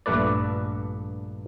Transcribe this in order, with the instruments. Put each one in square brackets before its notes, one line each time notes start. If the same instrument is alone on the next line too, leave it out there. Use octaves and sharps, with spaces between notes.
[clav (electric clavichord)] A#1 G2 A3 B4 D5